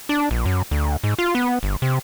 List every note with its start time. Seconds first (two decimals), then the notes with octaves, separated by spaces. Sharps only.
0.09 D4
0.31 A#1
0.46 F#2
0.71 D2
1.04 G#2
1.19 F4
1.35 B3
1.63 G1
1.82 C3